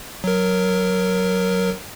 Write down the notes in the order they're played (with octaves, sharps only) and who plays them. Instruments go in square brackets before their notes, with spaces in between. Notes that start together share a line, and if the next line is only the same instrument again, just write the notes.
[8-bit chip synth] F#3 A#4